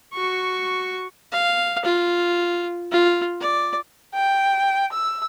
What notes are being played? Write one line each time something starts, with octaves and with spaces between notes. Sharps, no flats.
F#4 C#6
F5
F4
F4
D5
G5
E6